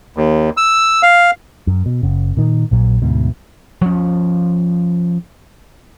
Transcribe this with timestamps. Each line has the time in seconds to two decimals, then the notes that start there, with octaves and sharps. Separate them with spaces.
0.16 D#2
0.57 E6
1.03 F5
1.67 F#2
1.86 B2
2.03 F#1 C#3
2.37 A#2 D#3
2.71 A#1 A#2 F#3
3.02 D2 G#2 B2
3.81 F3 C#4